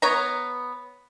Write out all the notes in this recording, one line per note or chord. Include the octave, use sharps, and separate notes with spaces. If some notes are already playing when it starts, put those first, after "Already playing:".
B3 C#5 A#5